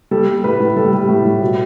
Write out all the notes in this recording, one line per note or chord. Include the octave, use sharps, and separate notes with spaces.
G3 A4
G3
A2 B4
A2
G3 A4
G3
A2
A2
B2